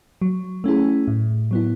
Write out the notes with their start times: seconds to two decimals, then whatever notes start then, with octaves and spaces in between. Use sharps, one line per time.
0.22 F#3
0.64 A3 C#4 E4 G#4
1.08 A2
1.51 F#3 B3 E4